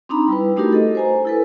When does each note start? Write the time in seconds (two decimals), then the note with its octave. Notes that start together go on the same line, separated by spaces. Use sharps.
0.09 C4 D4 D#4 A#5 B5
0.28 G3 E4 B4
0.56 A3 D4 D#4 F#4 G4 A#4
0.73 A4 D#5
0.95 C5 G#5 A#5
1.25 E4 A4 B4